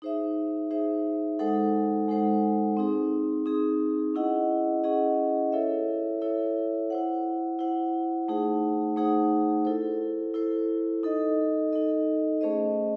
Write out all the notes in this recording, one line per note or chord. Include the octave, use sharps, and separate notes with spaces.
D#4 G#4 C5 E5
D#4 G#4 C5 E5
G#3 D#4 A4 C5 F#5
G#3 D#4 A4 C5 F#5
C4 D#4 G#4
C4 D#4 G#4
C#4 E4 G#4 D#5 F#5
C#4 E4 G#4 D#5 F#5
E4 A4 C#5 E5
E4 A4 C#5 E5
E4 C5 F#5
E4 C5 F#5
A3 D#4 G#4 C5 F#5
A3 D#4 G#4 C5 F#5
E4 A4 C5
E4 A4 C5
D#4 A4 D#5
D#4 A4 D#5
A3 C#4 G#4 C5 D#5